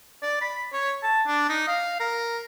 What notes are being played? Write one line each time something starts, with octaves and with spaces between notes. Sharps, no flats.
D5
B5
C#5
A5
D4
D#4
F5
A#4